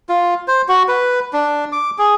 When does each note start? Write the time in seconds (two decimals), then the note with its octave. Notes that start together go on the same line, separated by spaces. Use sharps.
0.09 F4
0.48 C5
0.69 F#4
0.88 B4
1.33 D4
1.72 D6
1.98 G#4